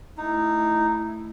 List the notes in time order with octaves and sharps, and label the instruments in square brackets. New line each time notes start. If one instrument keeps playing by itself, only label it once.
[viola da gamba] A3 E4 [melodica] D#4